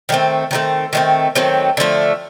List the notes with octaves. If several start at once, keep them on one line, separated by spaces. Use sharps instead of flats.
D#3 F#3 A3 C4
D#3 F#3 A3 C4
D#3 F#3 A3 C4
D#3 F#3 A3 C4
D3 F3 A3